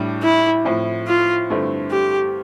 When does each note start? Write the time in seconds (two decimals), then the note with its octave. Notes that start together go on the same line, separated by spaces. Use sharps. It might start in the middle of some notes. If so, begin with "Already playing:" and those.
Already playing: A2 G3 D4
0.23 E4
0.65 A2 F3 C4 E4
1.07 F4
1.50 G2 D3 A3 C4 E4
1.91 G4